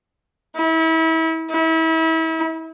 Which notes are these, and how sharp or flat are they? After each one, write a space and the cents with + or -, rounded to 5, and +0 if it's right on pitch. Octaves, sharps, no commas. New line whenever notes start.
E4 -35
E4 -35